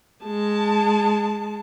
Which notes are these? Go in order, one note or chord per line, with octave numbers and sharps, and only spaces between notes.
G#3 A5